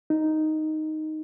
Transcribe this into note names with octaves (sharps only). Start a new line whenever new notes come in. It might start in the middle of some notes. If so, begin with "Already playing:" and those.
D#4